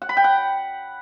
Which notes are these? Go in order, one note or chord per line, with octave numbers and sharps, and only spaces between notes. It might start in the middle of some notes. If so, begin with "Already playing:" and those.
F#5
B5
G5
F#5